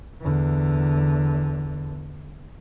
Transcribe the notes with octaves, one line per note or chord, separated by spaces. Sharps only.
E2 D3